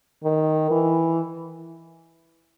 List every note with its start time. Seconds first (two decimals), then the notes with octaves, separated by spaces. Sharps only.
0.24 D#3
0.71 E3